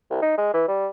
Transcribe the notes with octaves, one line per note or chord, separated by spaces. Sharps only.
C2
D#4
G#3
E3
G3